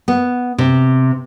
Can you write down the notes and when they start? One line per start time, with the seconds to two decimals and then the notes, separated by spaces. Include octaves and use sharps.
0.08 B3
0.58 C3